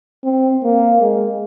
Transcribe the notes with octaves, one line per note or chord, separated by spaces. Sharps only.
C4
A#3
G#3